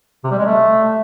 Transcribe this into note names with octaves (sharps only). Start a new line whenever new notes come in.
C3
G3
G#3
A3